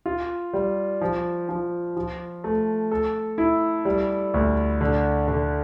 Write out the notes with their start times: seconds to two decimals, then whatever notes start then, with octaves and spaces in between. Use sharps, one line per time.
0.06 F4
0.54 G3
1.01 F3
1.49 F3
1.97 F3
2.44 A3
2.91 A4
3.38 E4
3.85 G3
4.34 D2
4.81 D3
5.28 D3